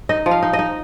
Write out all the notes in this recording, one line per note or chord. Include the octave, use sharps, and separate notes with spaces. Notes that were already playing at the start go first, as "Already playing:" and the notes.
D#4 D#5
F3
F5
D#4
D#5
D#4